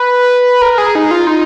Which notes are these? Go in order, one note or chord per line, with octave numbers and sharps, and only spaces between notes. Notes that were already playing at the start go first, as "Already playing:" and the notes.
Already playing: B4
A#4
G#4
D#4
F4
D#4